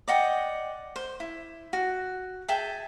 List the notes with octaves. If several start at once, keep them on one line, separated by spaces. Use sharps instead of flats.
D5 D#5 F#5 G5
C5
E4
F#4
G#4 E5 G5 A5